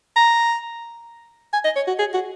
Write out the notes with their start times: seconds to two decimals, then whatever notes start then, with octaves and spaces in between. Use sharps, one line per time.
0.17 A#5
1.53 G#5
1.65 D#5
1.76 C#5
1.88 F#4
1.99 G#4
2.14 F#4